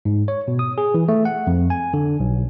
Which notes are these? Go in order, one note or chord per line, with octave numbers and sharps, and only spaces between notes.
G#2
C#5
B2
D#6
G#4
E3
A3
F#5
F2
G#5
D3
B1